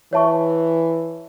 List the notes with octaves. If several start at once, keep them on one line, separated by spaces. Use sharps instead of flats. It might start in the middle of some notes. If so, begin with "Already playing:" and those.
E3 C#5 E5 A5 C#6